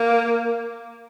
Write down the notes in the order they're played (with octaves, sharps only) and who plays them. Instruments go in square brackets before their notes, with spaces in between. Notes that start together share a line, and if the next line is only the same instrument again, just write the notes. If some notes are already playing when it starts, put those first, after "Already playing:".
Already playing: [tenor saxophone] A#3